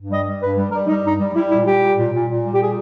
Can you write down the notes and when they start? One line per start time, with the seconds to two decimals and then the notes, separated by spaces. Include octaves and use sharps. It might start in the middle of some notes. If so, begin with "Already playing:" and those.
Already playing: G2
0.09 G3 D#5
0.24 G3
0.40 G2 B4
0.56 G3
0.71 G3 A#4
0.87 G3 D#4
1.03 G2 D#4
1.19 G3
1.34 G3 E4
1.49 A#2 E4
1.65 G3 G4
1.81 A#2
1.97 A#2
2.13 A#2
2.28 A#2
2.43 G3
2.52 G4
2.59 A#2 G#4